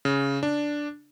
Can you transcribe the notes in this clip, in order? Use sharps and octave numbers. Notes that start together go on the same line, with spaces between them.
C#3
D4